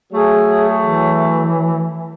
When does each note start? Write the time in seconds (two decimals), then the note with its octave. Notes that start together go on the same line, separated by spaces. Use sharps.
0.12 F#3 A3 G#4
0.83 E3